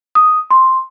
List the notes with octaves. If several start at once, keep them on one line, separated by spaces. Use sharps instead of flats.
D#6
C6